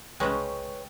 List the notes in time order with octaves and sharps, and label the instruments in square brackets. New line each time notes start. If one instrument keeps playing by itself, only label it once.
[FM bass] C2 [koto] C#3 G#3 [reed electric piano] B4 C#5 G5